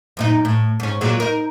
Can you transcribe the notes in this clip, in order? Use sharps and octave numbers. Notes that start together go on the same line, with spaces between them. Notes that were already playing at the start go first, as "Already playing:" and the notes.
F#2 A#2 D#4
A2
G#2 C#4
A#2 F#3 G#3
D#4 A#4